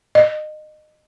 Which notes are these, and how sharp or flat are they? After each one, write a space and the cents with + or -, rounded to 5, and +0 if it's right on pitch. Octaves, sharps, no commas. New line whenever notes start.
D#5 -25